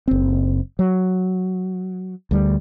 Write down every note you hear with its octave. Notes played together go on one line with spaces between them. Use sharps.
F#1 C4
F#3
D2 G3